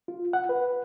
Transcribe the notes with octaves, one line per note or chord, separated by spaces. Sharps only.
F4
F#5
B4